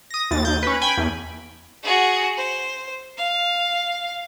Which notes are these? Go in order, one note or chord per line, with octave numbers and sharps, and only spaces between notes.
D#6 A#6
D#2 A6
D#2 G6
C#4 B4
G5 G#5 B5 G#6
E2
F#4 G#4
C5
F5